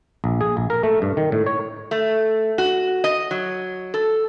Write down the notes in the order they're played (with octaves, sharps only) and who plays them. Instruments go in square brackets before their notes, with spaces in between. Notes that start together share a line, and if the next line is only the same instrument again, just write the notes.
[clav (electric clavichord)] A#1
G#4
A#1
A#4
A3
G2
D#3
A2
C#5
[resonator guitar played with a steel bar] A3
F#4
D#5
F#3
A4